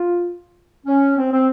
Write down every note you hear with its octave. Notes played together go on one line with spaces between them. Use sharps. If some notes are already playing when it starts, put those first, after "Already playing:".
Already playing: F4
C#4
C4
C4